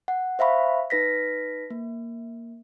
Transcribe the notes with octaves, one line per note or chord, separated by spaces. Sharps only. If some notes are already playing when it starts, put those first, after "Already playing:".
F#5
C5 E5 F5 B5 C#6
D#4 B4 A#6 B6
A#3